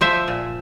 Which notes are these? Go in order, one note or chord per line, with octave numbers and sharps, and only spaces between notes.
F3 C5 E5
A#2